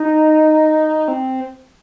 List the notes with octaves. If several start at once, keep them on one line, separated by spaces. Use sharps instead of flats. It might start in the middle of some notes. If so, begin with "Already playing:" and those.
Already playing: D#4
C4